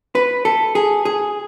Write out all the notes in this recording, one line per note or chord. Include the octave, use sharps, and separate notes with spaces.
B4
A4
G#4
G#4